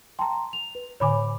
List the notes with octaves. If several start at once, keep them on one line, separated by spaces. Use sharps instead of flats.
G5 A5 A#5 C6
F7
B4
A2 D3 C#5 G#5 B5 D6